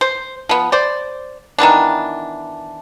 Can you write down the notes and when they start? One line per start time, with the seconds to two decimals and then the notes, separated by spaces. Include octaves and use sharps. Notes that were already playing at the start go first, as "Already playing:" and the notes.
0.01 C5
0.49 F3 B3
0.72 C5 D5
1.59 D#3 E3 B3 D4